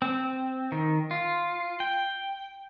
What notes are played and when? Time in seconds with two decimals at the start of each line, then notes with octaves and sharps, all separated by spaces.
0.02 C4
0.72 D#3
1.11 F4
1.80 G5